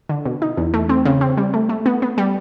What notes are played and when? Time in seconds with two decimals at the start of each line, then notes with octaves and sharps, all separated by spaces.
0.09 D3
0.26 B2
0.42 D#4
0.57 E2
0.74 A3
0.89 C4
1.05 C#3
1.21 C4
1.37 G3
1.54 A3
1.69 A3
1.86 B3
2.02 B3
2.18 G3